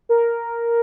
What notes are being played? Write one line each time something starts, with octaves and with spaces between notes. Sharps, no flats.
A#4